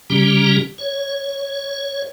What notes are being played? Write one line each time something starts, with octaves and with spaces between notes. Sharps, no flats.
C#3 G3 C#4 G4 A#5
C#5